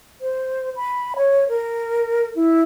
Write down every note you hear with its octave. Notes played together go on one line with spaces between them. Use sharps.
C5
B5
C#5
A#4
E4